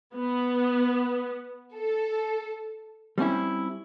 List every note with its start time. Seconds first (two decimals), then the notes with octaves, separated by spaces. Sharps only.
0.15 B3
1.75 A4
3.18 G3 C4 C#4 E4